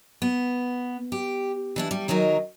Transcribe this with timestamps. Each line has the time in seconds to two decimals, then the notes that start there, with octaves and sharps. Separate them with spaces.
0.22 B3
1.12 G4
1.76 E3 D4 E4
1.91 G3
2.08 D#3 F#3 G#3 D#4 A#4